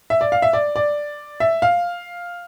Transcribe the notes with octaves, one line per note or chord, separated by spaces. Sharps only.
E5
D5
F5
E5
D5
D5
E5
F5